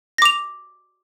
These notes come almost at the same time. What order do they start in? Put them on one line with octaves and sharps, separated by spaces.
A#6 D6 F7